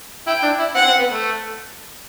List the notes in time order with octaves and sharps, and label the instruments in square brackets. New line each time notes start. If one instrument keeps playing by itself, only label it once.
[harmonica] E4 [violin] G5
[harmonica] D4
E4
[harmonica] C4 [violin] F#5
[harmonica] C4
B3
A3